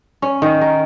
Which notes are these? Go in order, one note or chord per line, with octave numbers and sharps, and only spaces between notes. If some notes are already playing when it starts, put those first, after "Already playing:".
C#4
D#3
A#4